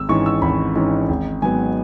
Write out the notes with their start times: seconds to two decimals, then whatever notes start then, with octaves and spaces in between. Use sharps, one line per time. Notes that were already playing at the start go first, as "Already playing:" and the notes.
Already playing: G#1 E6
0.09 G#2 E3 C#4 C#6
0.26 E6
0.42 G#1 B5
0.76 G#2 E3 C#4
1.09 G#1
1.42 G#2 F#3 B3 G#5